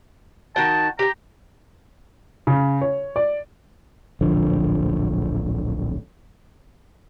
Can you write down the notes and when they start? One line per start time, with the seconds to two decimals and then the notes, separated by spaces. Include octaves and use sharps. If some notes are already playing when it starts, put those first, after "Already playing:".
0.56 D#3 F#4 G5 A5
0.99 G4 G5 A#5
2.47 C#3
2.81 C#5
3.16 D5
4.21 D1 A#1 D3 F3